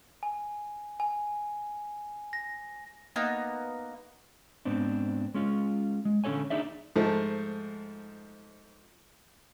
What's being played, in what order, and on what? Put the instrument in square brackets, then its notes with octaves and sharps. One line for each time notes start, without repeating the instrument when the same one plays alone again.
[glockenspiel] G#5
G#5
A#6
[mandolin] A#3 B3 D#4
[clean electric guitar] G#2 B3 C4 D4
G#3 C#4 F4
G#3
D3 C#4 F#4 A4 C#5 G#5
D4 D#4 G#4 D5 E5
[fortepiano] G#2 F3 A3